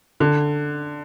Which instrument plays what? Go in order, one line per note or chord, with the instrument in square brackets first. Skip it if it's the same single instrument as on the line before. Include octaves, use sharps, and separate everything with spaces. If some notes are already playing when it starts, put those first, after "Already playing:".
[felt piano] D3